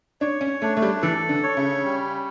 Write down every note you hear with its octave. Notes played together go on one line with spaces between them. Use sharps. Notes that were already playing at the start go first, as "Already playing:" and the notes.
D4 C#5
C#4
A3 D4
A3
G3
E3 A4
D3
C#5
C#3
G3